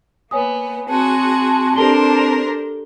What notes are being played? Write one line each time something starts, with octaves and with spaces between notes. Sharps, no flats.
A#3 B3 C#5 G#5 D#6
C4 F#4 G#4 F#5 A5 C6
D4 G4 A4 A#4 C5 G7